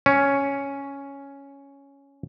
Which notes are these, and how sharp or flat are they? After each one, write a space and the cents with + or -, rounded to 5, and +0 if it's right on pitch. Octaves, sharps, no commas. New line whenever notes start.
C#4 +5